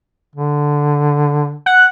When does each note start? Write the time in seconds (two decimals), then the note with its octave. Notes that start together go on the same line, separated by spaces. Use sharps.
0.35 D3
1.66 F#5